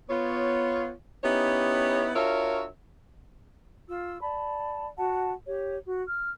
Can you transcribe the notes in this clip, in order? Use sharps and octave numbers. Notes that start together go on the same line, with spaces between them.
B3 F4 C#5
B3 C#4 D#4 E4 G4 C#5
D4 F4 F#4 A#4 C#5 E5
F4 E6
D5 A5 B5
F#4 F#5 A5
G4 C#5
F#4
F6